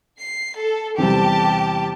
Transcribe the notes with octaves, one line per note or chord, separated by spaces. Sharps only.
C7
A4
E2 C3 G3 G4 A5